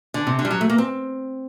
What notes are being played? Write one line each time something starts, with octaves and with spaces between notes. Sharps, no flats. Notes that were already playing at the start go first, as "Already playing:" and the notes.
D3
C3
D3
G3
F#3
A3
A#3
C4